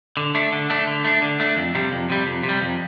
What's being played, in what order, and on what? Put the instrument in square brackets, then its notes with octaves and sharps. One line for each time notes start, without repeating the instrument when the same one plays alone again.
[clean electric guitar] D3
A3 D4
D3
A3 D4
D3
A3 D4
D3
A3 D4
F2
C3 G3
F2
C3 G3
F2
C3
G3
F2